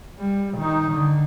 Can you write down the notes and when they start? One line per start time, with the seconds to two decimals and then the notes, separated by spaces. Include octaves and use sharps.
0.19 G3
0.58 D#3 D#4
0.92 D3